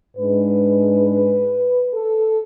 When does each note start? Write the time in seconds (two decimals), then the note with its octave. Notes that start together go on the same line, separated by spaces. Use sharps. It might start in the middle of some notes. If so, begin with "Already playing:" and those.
0.16 G#2 G#3 D4 B4
1.94 A4